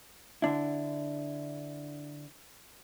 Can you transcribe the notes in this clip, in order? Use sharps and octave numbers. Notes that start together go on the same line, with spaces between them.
D3 D4 E4